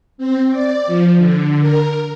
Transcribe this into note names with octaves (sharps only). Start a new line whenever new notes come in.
C4
D5
F3
D3
A#4